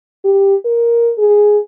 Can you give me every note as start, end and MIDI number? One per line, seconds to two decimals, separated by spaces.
0.25 0.55 67
0.65 1.12 70
1.18 1.59 68